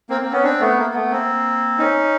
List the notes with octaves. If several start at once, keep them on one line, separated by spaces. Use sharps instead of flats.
A#3 C4
A#3 C4
B3 C#4
C4 D4
A3 B3
A#3
A3 B3
A#3 C4
C#4 D#4